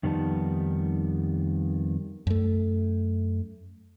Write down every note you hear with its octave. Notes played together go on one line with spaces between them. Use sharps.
F2 D#3 G3 B3 D#4 A5
F#2 A3